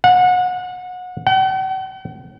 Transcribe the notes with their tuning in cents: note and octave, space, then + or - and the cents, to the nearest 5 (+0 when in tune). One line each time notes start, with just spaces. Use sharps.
F#5 -30
F#5 +45